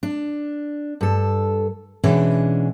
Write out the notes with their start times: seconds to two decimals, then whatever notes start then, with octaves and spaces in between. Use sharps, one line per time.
0.03 D4
1.01 G2 A4
2.04 B2 E3 G#3 C#4 D4